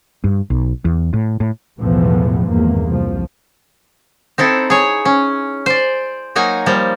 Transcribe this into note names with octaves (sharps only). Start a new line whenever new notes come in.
G2
B1
E2
A2
A2
B1 E2 A2 E3 F3 B3
G#1 E2 G2 A#3
C2 F3
C4 D#4 E4 A4
G#4 C#5
C#4
C5 D5
F#3 A#3 D#4 G#5 A#5
F3 G3 A#3